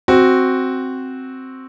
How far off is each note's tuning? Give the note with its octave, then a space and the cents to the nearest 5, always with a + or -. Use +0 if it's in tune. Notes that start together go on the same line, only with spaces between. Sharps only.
C4 +0 F#4 +0